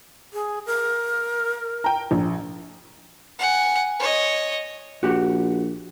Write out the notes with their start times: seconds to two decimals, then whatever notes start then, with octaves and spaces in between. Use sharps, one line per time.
0.33 G#4
0.66 A#4
1.84 G5 A#5
2.11 A#1
3.39 F#5 G#5
3.99 C#5 D#5
5.03 A#1 F#4 G4 F#5